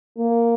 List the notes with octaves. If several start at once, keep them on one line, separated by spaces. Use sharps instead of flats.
A#3